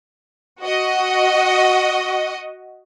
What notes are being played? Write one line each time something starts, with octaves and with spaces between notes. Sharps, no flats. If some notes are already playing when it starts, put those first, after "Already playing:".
F#4 D#5